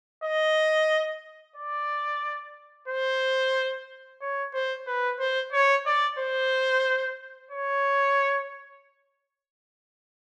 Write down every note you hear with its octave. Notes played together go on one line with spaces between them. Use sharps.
D#5
D5
C5
C#5
C5
B4
C5
C#5
D5
C5
C#5